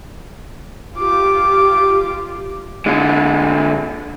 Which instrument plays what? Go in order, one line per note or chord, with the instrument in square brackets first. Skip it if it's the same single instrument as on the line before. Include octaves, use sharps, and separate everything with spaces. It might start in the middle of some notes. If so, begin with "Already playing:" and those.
[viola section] F4 G4 [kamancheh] D6
[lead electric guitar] D3 G#3